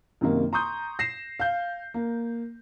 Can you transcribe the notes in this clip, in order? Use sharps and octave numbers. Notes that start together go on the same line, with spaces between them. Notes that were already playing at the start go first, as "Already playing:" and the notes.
F#2 C3 D#3 A#3
A#5 C6 C#6 D#6 G6
A#6 C7 E7
F5 G6
A#3